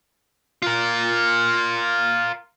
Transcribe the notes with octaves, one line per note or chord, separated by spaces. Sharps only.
F4 A#4